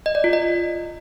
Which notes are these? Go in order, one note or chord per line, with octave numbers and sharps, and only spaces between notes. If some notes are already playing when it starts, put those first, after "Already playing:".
D#5
D5
F4
D#5